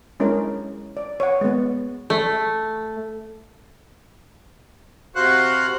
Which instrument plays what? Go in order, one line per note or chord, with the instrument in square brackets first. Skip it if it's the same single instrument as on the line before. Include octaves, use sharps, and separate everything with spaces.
[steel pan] G#3 C#4 D4 E4 A#4
D5
C#5 F#5
G#3 B3
[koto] A3
[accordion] C3 F#4 C5 F5 F#5 F#6